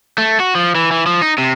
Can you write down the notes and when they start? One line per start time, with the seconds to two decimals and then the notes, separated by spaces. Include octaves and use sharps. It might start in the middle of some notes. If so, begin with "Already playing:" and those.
0.18 A3
0.40 F#4
0.55 F3
0.75 E3
0.91 E3
1.06 F3
1.22 D#4
1.38 C3